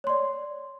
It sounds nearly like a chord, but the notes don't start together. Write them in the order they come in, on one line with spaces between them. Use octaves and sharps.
C#5 C6 D5